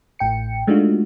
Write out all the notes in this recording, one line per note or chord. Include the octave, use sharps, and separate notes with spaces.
A1 A2 G5 C#7
G#3 A3 D4 D#4 F4 F#4